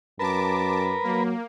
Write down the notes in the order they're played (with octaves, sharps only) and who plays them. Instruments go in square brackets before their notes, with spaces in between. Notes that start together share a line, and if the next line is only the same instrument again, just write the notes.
[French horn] F#2 [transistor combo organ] A#4 B4 [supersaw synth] A5 D6
[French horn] F#3 [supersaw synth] A#3